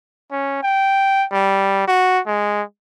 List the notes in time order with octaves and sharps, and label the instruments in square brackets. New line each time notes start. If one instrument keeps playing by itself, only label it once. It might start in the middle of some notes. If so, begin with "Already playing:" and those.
[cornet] C#4
G5
G3
F#4
G#3